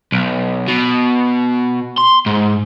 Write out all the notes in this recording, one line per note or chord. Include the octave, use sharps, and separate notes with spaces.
B1
B2
C6
G#2